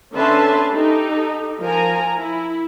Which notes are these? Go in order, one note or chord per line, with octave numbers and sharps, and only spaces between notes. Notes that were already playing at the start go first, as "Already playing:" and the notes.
D3 C#4 B4 E5 A5 C6
D#4 G4 A4
F3 A#4 G#5 A#5
E4